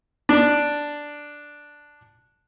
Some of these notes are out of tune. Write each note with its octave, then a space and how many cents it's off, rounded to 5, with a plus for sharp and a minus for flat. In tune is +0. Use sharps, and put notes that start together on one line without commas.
D4 +0 D5 +0